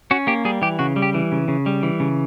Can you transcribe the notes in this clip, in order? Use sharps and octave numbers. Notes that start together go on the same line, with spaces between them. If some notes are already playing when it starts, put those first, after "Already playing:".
C#4 F#4
A#3 G4
G3 G#4
E3 G4
C#3 F#4
G3
G4
E3
C#3
C#3
G3
E3
C#3